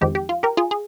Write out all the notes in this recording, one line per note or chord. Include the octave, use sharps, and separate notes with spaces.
F2 D#3 G#3 C4 G4
G4
F4
G4 A#4
F4 G#4
G#4